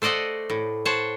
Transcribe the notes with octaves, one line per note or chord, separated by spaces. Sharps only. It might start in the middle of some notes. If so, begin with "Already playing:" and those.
A3 C5 D5 D#5 F#5
A2
C5 C#5 F#5 A5